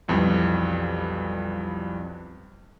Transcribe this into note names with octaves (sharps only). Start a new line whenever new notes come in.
B1 F2 E3 G3